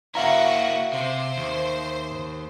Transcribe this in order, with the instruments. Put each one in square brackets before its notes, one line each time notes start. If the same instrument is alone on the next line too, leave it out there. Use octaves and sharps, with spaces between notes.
[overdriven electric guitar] A#3 E4 [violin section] F#4 [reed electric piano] E5 F5 A#5
[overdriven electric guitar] C3 [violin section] C5
[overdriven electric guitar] D#2